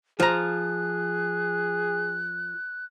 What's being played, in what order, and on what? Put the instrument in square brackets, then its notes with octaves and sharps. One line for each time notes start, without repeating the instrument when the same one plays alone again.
[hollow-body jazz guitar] F3 [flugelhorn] G#4 [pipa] C5 A#5 [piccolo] F#6